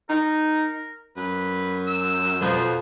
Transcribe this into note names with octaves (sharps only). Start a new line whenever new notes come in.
D#4 A#4
F#2 B4
E6
F2 B2 F3 C5